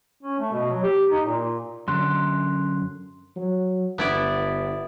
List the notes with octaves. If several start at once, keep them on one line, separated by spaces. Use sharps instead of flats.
C#4
A3
B2
F#3
G4
D#4
A#2
F#2 D3 C6 F#6
F#3
G1 B3 E4 D5